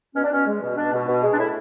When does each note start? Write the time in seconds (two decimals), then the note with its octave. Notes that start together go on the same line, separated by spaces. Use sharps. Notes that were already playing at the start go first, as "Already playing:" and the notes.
0.15 B2 C#4
0.24 D4
0.31 B2 C#4
0.46 G#3
0.61 B2
0.77 B2 D4
0.93 B2
1.07 B2
1.23 G#3
1.33 D4
1.38 A2 E4